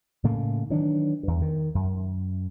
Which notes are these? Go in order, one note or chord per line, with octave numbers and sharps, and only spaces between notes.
A2 C#3 A3 A#3
D#3 E3 F#3 D4
E2 G2
D#3
F#2